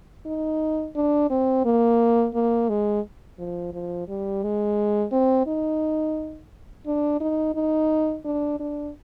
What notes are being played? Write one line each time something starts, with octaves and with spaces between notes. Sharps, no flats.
D#4
D4
C4
A#3
A#3
G#3
F3
F3
G3
G#3
C4
D#4
D4
D#4
D#4
D4
D4